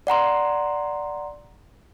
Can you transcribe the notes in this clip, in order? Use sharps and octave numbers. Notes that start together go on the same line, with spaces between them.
D5 F#5 A#5 C6